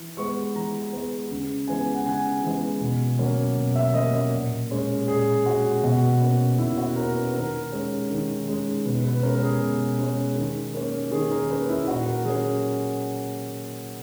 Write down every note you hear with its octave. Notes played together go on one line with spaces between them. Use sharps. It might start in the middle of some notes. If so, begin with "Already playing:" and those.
Already playing: E3
G#3 B3 C#6
E3 A#5
G#3 B3
C#3
E3 G#3 B3 G#5
F#5
C#3 G#5
E3 G#3 B3
B2
F#3 A#3 C#4
B2
E5
F#3 A#3 C#4 D#5
D#5
A#2
G#3 C#4
A#2 G#4
G#3 C#4 F#4
B2 F#4
A#3 C#4
B2 E4
F#4
A#3 C#4 A#4
B4
D#3 A#4
G#3 C#4
D#3
G#3 C#4
B2 B4
B4
G#3 C#4 A#4
A#4
G#4
B2
G#3 C#4
D#3
A#3 C#4
D#3 G#4
A#4
A#3 C#4 B4
E4
A#2 F#4
A#4
F#3 A#3 C#4 G#4